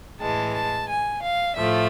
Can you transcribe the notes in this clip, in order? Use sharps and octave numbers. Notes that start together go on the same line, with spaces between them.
A2 E3 G#3 A5
A5
G#5
F5
A2 F3 A3 E5